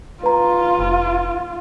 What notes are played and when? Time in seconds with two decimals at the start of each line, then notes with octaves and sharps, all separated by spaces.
0.23 F4 B4 A#5
0.79 F1